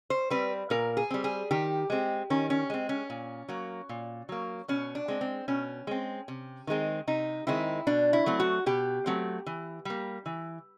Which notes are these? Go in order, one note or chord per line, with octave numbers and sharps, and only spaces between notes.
C5
G3 C4 B4
A#2 A#4
G#4
G3 C4
G#4
D#3 G4
G#3 C4
D#3 C#4
C#4
G#3 C4
C#4
A#2
F#3 A#3
A#2
F#3 A#3
B2 C#4
D4
G#3 C4
C4
B2 C#4
G#3 C4
C3
D#3 G#3 C4
C3 D#4
D#3 G#3 C4 E4
B2 D4
E4
F#3 A3 C4
F#4
B2 G4
F#3 A3 C4
E3
G3 A#3
E3